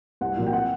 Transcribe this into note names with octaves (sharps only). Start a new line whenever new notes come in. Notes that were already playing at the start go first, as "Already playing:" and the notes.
C2 F#5
A#2 F#3 A#3
G5
F#5